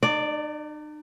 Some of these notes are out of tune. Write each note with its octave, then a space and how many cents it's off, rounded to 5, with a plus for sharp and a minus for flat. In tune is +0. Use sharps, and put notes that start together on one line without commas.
D#4 -45 D5 +0